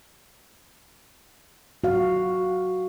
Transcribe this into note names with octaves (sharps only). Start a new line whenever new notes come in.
F#4 F5